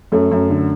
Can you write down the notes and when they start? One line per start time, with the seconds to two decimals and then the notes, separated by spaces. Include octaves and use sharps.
0.12 F#2 A3
0.31 F#2
0.50 D3